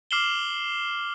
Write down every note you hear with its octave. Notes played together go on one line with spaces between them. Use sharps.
D6 F6 C7 E7 F#7 G7